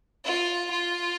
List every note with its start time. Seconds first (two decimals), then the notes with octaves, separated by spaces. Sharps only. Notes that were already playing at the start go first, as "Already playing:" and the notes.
0.25 F4
0.71 F4